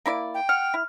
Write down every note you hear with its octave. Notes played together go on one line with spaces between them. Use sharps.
A#3 E4 D5
G5
F#5 F6
E4